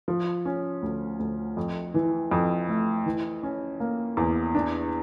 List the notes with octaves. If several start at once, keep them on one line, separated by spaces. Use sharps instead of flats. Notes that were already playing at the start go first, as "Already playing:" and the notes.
F3
C#4
D2
D2
F2
E3
F2
A3
E3
C#4
A#3
E2
D4